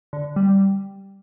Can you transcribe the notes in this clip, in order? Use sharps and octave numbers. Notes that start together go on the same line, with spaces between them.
D3
G3